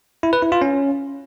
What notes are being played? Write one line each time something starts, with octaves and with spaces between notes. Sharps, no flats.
E4
B4
E4
F4
C#4